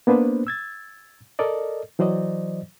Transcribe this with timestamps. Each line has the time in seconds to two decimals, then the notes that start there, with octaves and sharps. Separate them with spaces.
0.07 A#3 B3 D4 B4 C5
0.47 E6 G#6 A6
1.39 A4 A#4 D5 D#5
1.99 E3 F#3 C5 D5 D#5